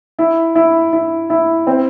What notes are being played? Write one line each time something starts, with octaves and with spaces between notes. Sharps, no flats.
E4
E4
E4
E4
C4